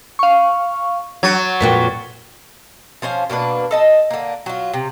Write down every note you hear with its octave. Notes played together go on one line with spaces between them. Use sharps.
F5 C#6
F#3 G#6 A6 C#7
F2 A#2 F#4 B4 G5
F3 C#4 C5 F5
B2 A#3 D4 B4
A4 D#5 A5
D3 A#3
F#3 F4
C3